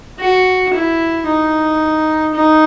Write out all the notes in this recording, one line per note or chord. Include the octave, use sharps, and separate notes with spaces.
F#4
E4
D#4
D#4